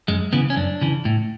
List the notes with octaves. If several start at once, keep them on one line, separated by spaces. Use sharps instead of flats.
F#2 G#3
C#3 E3 B3
C#4
F#2 D4
C#3 E3
A2